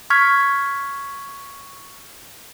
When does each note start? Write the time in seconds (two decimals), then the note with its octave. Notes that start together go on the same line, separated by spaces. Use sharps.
0.10 C#6 F6 G#6 B6